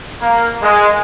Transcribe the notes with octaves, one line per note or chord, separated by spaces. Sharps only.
A#3
G#3